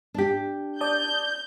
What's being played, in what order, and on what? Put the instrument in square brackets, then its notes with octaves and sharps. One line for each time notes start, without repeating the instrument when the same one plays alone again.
[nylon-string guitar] D4 G4
[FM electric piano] D5 A5 D#6 [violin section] G6